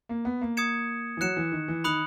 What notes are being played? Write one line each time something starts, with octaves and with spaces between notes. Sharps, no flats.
A#3
B3
A#3
D#6 G#6 C#7 E7
E3
F#3 F#6 C#7 E7
E3
D#3
E3
D#3 B5 D#6 F#6 C#7 F#7